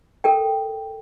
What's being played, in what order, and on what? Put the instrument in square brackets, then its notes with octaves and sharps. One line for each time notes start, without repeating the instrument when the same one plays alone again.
[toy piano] A4 A#4 G5